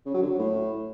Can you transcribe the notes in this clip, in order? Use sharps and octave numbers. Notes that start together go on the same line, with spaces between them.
C#3
F#3
D3
F#3
A2